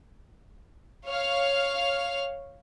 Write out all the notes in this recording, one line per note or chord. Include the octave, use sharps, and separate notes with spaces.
C#5 F5 F6